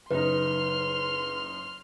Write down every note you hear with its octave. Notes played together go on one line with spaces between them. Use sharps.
F#1 D#4 B4 C6 F6